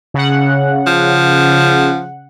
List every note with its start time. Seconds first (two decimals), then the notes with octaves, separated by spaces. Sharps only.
0.14 C#3 F#5
0.87 F3